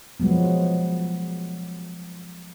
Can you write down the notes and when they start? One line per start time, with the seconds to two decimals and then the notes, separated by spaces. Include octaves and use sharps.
0.20 F3 F#3 G#3 B3